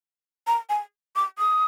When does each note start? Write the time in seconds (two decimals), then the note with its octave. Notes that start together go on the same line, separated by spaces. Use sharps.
0.47 A#5
0.69 G#5
1.16 D6
1.39 D#6